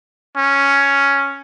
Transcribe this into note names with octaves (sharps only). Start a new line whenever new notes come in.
C#4